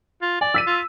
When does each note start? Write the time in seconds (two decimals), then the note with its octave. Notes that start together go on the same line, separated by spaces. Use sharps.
0.22 F4
0.41 D5 G#5
0.54 E6 B6 D#7
0.67 F4